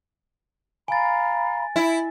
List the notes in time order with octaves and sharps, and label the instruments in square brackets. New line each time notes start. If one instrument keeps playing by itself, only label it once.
[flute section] F5 A#5 B5 [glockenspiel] G#5 A6
[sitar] E4